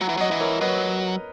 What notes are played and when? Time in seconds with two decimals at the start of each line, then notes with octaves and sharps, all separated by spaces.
0.01 F#3 F#5 A#5
0.09 E3
0.17 F#3 D#5 F#5
0.31 E3
0.40 A#4 C#5
0.61 F#3 B4 D#5